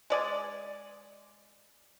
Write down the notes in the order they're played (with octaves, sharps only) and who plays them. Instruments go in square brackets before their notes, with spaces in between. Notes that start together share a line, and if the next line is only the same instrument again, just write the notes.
[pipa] G#3 D5 G#5